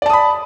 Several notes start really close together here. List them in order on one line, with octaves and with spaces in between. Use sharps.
D5 A5 D#6 B5